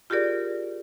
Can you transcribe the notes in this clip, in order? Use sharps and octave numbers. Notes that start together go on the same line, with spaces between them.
F4 G4 G#4 A#4 D5